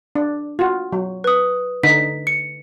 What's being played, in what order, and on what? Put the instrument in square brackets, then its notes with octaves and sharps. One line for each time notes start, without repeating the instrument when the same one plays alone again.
[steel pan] D4
F4 F#4
F#3
[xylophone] B4 D#6
[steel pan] D3 D#4 [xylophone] B6
[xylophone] C#7